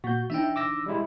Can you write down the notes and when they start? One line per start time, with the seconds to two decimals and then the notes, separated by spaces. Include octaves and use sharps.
0.04 A#2 F#4 G6
0.30 E3 D4 D#4 E5 G5
0.56 D6 E6 A#6
0.86 G3 G#3 E4